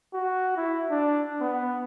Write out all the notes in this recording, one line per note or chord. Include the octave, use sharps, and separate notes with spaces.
F#4
E4
D4
B3